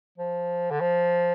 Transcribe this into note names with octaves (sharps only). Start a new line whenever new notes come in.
F3
D3
F3